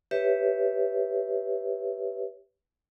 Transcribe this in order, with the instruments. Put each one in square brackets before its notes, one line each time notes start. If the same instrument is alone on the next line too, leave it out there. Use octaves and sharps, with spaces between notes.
[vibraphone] G4 B4 C#5 E5